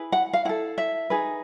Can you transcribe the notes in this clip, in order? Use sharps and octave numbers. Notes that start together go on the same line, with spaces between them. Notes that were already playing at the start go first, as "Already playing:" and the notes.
Already playing: E4 G#4 B4
F#5
F5
E4 A4 F#5
E5
D#4 G#4 B4